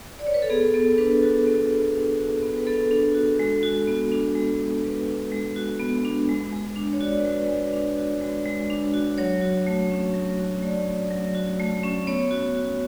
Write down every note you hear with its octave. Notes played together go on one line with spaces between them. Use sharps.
D5
C#5
B4
A4
B3 G#4
B3 A4
D4 B4
F#4 A4
B3
B3
D4
F#4
B3
B4
B3 A4
D4
F#4
G#3
F#4
B3
D4
G#3
F#4
B3 B4
D4
G#3
F#4
B3
D4
G#3
G#3
D4
C#5
F#4 D5
G#3 B4
D5
G#3
B4
D4
F#4
G#3
G#3
D4
F#4
F#3 C#5
F#4
A3
C#4
F#3
F#4
A3 D5
C#4
F#3
F#4
A3
C#4
B3 C#5
F#4
F#4